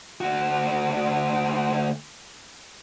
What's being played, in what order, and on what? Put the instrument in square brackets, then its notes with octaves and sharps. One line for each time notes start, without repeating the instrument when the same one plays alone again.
[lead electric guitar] D2 F#4